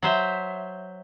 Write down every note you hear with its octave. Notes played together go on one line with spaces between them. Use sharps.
F#3 C5 E5